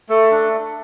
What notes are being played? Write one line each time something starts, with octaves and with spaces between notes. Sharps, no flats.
A3 A4
D4